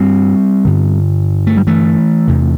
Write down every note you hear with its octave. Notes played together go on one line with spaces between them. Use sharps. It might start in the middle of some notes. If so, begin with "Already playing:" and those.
Already playing: G2 D3 G3 C4
G2 D3
A3
G3
E3 A3
E2 C3